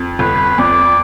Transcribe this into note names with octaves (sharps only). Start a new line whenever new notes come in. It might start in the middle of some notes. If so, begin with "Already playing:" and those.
Already playing: F2
G1 B4
F2 D5